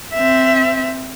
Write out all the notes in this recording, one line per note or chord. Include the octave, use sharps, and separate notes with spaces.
C4 E5